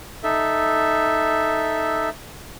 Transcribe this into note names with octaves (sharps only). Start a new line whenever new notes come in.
D#4 A4 E5